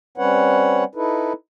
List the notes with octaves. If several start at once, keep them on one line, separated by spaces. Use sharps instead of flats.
G3 C4 C#4 B4 C#5 F#5
D#4 E4 A4 B4